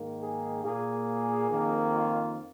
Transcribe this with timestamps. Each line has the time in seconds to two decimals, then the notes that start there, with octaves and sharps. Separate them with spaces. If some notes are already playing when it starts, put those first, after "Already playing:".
Already playing: G#2 D#3 A#3
0.21 G#4
0.64 A#2 A#3 G#4
1.50 F2 D#3 A#3
1.94 F4